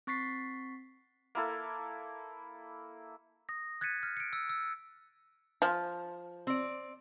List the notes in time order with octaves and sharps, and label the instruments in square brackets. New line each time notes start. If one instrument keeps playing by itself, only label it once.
[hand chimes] C4 C#6 A6 B6 C7
[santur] A#3 E4 A4
[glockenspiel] D#6 A#6
F#6 G#6 A6 B6 C#7 D#7
F6
C#7 D7
E6
E6
[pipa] F3
[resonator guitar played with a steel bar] C4 D5